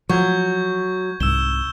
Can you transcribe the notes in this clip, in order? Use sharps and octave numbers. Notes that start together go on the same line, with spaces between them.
F3 F#3 C#6 G6 G#6
C2 G#2 E6 E7 G7